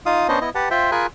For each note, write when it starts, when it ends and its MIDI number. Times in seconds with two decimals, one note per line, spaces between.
0.06 0.27 63
0.06 0.27 65
0.06 0.27 77
0.06 0.27 87
0.29 0.39 59
0.29 0.39 61
0.29 0.39 62
0.29 0.39 72
0.29 0.39 75
0.41 0.50 59
0.41 0.50 64
0.41 0.50 75
0.55 0.69 67
0.55 0.69 71
0.55 0.69 78
0.55 0.69 81
0.71 0.91 65
0.71 0.91 72
0.71 0.91 76
0.71 0.91 79
0.92 1.07 65
0.92 1.07 68
0.92 1.07 70
0.92 1.07 80
0.92 1.07 83
0.92 1.07 90